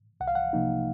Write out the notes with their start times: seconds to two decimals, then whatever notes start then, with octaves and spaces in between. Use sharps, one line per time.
0.20 C2 F#5
0.28 F5
0.35 F#5
0.53 C3 F3 A#3 D#4